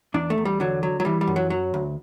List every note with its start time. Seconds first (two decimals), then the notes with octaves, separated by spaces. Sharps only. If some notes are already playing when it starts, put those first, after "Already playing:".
0.14 E2 D4
0.30 A3
0.38 E2
0.45 G3
0.60 D3 F#3
0.83 F#3
1.00 F#3
1.05 E3 G3
1.21 G3
1.27 F#2
1.36 F#3
1.50 F#3
1.74 D2